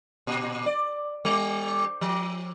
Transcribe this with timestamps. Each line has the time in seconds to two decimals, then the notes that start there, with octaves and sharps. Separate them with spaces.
0.27 A#2
0.66 D5
1.25 G3
2.01 F3